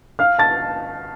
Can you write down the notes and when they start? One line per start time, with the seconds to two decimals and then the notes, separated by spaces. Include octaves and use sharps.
0.19 F5 F6
0.39 A5 A6